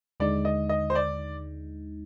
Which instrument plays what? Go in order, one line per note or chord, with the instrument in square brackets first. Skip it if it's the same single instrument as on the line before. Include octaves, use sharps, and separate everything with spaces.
[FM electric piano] D#2 D3 G#3 D#4 [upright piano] D5
[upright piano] D#5
D#5
C5
D5